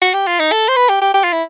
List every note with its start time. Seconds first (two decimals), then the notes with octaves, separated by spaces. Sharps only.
0.02 F#4
0.14 G4
0.27 F4
0.40 D#4
0.52 A4
0.69 C5
0.76 B4
0.89 G4
1.02 G4
1.14 G4
1.24 F4
1.33 E4